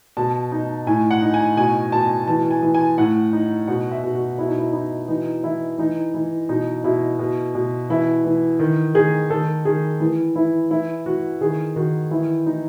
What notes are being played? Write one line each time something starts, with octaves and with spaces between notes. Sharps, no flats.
B2 A5
D#4
A2 G#5
F#5
D#4
G#5
B2 G#5
B2 A5
E3 A5
G#5
E3
G#5
A2 F#5
D#4
B2 F#5
E5
B2
F#4
B2 E4
D#4
E4
D#4 E4
E3 D#4
E3 E4
E3 D#4
E3
B2 D#4
B2 E4
B2
B2
E3 E4
E3
D#3
D#3 G#4
D#3 A4
D#3 G#4
E3
E3 E4
E3 E4
E3 F#4
D#3 G#4
D#3 F#4
E3 E4
E3 D#4